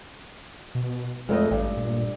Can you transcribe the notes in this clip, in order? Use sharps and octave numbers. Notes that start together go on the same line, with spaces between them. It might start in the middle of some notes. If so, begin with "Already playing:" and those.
B2
F2 G#3 A3 D#5
A1 G2
A#2